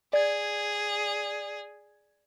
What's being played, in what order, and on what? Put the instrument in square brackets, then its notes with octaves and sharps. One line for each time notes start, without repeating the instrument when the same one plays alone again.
[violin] G#4 [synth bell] D5 G#6